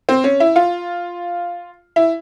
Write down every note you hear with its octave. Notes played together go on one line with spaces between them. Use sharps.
C4
C#4
E4
F4
E4